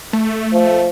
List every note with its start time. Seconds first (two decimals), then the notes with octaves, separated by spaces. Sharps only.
0.13 A3
0.53 F3